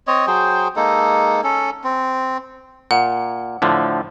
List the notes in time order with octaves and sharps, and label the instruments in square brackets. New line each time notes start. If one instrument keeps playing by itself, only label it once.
[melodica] C4 C#5 D#5
F#3 G#4 C5 G5
G#3 A#3 D#4 A4
C#4 A4
C4
[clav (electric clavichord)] A#2 [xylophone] F#5
[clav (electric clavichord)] A2 D3 F3